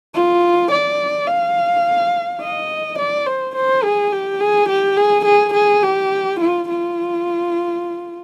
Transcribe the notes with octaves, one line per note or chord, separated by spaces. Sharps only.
F4
D5
F5
D#5
D5
C5
C5
G#4
G4
G#4
G4
G#4
G#4
G#4
G4
F4
F4